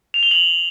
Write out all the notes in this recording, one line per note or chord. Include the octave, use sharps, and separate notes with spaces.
F7
G7
F#7